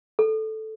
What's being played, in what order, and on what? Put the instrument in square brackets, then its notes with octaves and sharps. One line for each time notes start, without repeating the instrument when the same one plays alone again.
[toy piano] A4